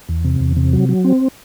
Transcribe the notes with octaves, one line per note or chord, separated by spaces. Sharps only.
E2
C3
E2
C3
F#3
F#3
C4